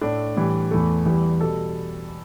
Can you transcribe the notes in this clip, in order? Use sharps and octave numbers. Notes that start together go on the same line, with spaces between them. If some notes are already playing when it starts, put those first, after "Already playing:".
A2 A3 D4
A2 E3 G3
E2 E3 A3
E2 E3 G3
B2 G3 A4